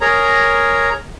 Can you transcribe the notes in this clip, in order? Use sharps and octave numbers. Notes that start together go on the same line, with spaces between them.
G#4 A#4 C#5 A#5